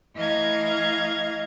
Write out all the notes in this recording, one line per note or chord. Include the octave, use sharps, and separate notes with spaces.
E3 A3 D#5 F5 A#5 G#6